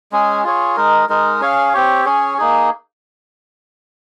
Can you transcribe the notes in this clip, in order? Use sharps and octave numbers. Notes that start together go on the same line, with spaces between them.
G#3 C#4 G#4
F4 G#4 C#5
G#3 D#4 A#4
G#3 D#4 A#4
C#4 G#4 C#5 F5
C4 G4 C#5
C#4 G#4 C#5
A#3 D#4 G#4